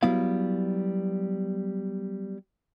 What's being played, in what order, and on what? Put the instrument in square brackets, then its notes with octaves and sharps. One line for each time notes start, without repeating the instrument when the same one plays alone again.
[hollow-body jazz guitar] F#3 G3 B3 E4 F5